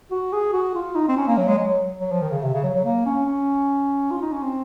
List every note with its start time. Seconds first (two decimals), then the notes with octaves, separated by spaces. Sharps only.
0.11 F#4
0.33 G#4
0.53 F#4
0.75 F4
0.95 D#4
1.09 C4
1.17 C#4
1.28 A#3
1.38 F#3
1.48 G#3
1.59 F#3
2.01 F#3
2.12 F3
2.22 D#3
2.32 C#3
2.42 C3
2.54 C#3
2.64 F#3
2.74 F#3
2.85 A#3
3.06 C#4
3.26 C#4
4.11 F4
4.22 D#4
4.32 C#4
4.43 C4